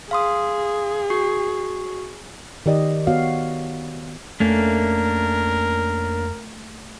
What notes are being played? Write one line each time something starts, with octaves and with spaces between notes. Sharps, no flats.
G#4 F5 C6 D#6
F#4 C#6 C7
D#3 G4 D5 D#5
B3 F#4 C#5 F5
F2 A3 A#3 C#4 D4 A#4